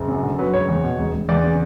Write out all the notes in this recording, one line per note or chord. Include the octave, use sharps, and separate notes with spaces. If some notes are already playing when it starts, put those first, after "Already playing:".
Already playing: F#1
F#2
D3
F#3 B4
F#1 C#5
E2
B2
E1
E1
E2 D5
C#3